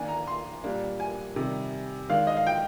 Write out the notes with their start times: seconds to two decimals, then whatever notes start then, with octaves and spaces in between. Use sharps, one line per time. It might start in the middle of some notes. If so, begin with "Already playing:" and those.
Already playing: D#3 A#3 D4 G#5
0.08 A#5
0.27 C6
0.64 A#2 G3 A#3 D4
1.00 G#5
1.36 C3 D#3 G3
2.10 D#3 G#3 D4 F5
2.27 D#5
2.37 F5
2.47 G5